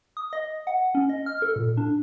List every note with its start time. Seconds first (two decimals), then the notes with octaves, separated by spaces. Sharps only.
0.17 D#6
0.33 D#5
0.67 F#5
0.95 C#4
1.09 D#5
1.26 F6
1.42 A4
1.56 A#2
1.77 D4